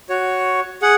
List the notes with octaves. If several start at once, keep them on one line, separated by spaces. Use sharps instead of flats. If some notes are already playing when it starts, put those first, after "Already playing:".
F#4 C#5
G#4 F#5